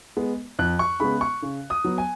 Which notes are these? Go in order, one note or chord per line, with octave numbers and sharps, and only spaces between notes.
G#3 B3
F2 F#6
C#6
C#3 G#3 B3 B5
C#6
C#3
D#6
F#3 B3
G#5